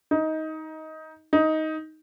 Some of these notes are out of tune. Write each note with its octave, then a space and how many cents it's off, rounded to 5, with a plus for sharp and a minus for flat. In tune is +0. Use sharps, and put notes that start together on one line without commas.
D#4 +15
D#4 +10